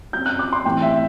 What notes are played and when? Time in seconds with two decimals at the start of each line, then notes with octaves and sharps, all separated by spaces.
0.13 F#2 F#3 C4 G6
0.26 F#6
0.39 D6
0.53 C6
0.65 A2 E3 G3 C4 G5
0.82 E5